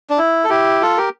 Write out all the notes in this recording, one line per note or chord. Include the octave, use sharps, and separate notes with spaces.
D4
E4
A4
E4 G4
F4 A4
G4 A#4